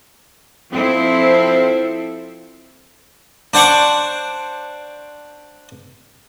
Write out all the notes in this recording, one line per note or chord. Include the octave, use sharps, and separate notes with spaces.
F3 C4 E4 A4
D4 C5 F#5 C#6 D6